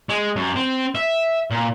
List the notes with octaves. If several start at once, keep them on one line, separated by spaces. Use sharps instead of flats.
G#3
F#2
C4
E5
A#2